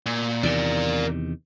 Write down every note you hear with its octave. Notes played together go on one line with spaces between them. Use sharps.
A#2
E2 C3 D#3 A#4 D5